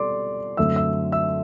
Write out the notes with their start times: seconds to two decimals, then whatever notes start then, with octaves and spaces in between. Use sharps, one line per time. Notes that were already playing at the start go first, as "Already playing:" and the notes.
Already playing: B2 G3 C4 A4 D5 C6 D6
0.57 F#2 D3 A3 C4 E5 E6
0.76 E5 E6
1.12 E5 E6